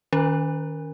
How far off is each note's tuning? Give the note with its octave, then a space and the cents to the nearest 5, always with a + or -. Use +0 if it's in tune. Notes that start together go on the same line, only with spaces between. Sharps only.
D#3 +0 C#4 +35 A#4 +0